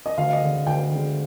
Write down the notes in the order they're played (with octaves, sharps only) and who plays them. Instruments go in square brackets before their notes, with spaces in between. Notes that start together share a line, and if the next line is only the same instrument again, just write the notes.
[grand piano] D#5
D2 F5
D#5
D3 G#3
D2 G5
D3 G#3